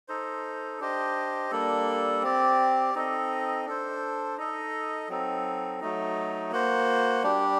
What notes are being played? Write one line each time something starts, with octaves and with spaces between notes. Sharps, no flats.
D#4 A4 C5
D4 G4 C5 D#5
G3 A#3 D4 A4
C4 G4 D5
C4 D#4 A4 D#5
D4 A4 C5
D#4 A4 D#5
F#3 C4 D#4 A4
F#3 A3 D#4
A#3 F#4 C5
G3 D4 G4